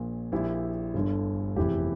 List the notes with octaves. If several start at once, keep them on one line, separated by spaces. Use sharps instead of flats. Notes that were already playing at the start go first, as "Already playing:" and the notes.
Already playing: A#1 A#2
A#1 A#2 E4 G4
G1 G2 D3
F1 E2 C3 E3 E4 G4